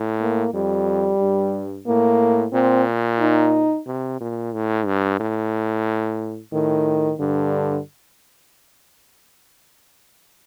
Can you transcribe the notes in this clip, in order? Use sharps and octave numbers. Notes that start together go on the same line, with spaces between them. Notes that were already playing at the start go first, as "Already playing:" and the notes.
Already playing: A2
A#3
F2 G3
G2
A2 A#3
A#2 C4
D#4
C3
A#2
A2
G2
A2
A2 D#3
G2 D3